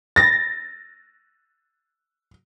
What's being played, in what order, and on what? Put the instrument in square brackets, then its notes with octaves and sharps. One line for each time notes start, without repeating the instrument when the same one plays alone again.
[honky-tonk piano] A6 A#6